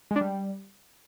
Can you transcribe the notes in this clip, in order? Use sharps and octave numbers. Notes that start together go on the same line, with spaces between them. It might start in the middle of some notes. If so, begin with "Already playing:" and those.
G#3
D4
G3